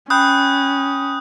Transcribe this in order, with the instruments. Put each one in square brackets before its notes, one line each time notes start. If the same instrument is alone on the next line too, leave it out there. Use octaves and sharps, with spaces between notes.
[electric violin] C#4 [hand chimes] G5 B5 [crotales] D#6 F#6 G6